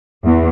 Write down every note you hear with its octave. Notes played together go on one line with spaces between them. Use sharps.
E2